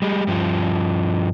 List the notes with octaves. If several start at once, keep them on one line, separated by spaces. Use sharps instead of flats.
G3 G#3
G2 F3